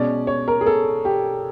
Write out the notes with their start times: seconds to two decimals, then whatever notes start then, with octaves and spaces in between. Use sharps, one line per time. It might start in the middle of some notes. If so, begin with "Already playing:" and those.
Already playing: B2 G#3 C#4 D5
0.27 C#5
0.48 A#4
0.61 G#4
0.66 A4
1.05 G4